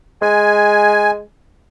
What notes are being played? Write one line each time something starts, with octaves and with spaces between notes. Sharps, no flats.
G#3 G#5